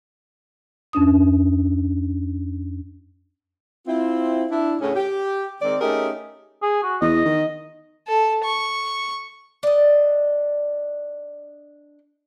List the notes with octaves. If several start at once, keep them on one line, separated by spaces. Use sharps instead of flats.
F2 C#4 D4 D#6
C4 E4 F4
D4 E4
A2 C#3 C#4
G4
D#3 G#3 C4 D5
A3 C#4 D#4 G4 G#4 A#4
G#4
F#4
E2 D#5
D#3
A4
C#6
D4 D#5